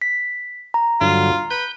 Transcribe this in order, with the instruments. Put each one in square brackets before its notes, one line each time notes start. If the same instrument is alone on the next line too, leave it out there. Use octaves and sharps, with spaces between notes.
[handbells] B6
A#5
[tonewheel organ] G2 D3 F#3 [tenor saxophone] F4
[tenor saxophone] B4 [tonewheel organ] G6